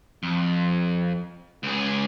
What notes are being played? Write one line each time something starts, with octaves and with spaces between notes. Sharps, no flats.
F2
C#2 G#4